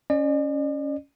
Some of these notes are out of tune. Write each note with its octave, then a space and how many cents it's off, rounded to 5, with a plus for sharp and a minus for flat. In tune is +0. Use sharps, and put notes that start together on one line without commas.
C#4 +5 D5 +45